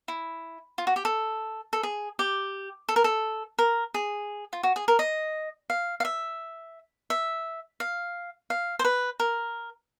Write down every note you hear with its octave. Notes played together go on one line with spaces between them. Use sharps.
E4
F4
F#4
G4
A4
A4
G#4
G4
A4
A#4
A4
A#4
G#4
F4
F#4
G#4
A#4
D#5
F5
F5
E5
E5
F5
F5
C5
B4
A#4